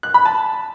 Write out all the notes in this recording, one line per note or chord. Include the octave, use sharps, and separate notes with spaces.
F#6
B5
A5